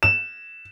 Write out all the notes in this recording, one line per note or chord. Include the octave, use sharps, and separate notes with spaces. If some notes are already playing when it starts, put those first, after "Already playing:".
E7